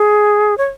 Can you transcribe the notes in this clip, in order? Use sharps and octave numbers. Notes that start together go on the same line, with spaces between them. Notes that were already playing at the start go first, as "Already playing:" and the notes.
Already playing: G#4
C#5